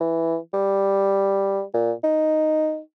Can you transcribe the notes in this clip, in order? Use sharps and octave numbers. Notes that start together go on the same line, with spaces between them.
E3
G3
A#2
D#4